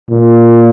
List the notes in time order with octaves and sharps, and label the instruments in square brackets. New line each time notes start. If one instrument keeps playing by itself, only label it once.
[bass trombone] A#2